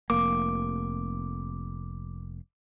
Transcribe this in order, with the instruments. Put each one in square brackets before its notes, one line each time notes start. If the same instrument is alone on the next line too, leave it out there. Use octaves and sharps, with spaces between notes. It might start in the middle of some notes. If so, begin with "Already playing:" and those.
[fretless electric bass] F1 A#3 [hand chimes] D6